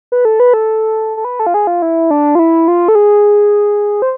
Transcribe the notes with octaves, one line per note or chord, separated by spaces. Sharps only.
B4
A4
B4
A4
A4
B4
A4
F4
G#4
F4
E4
D4
F4
E4
F4
A4
G#4
C5